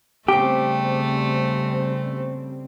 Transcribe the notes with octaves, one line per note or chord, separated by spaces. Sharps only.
C#3 G3 A3 B3 C4 G4 C5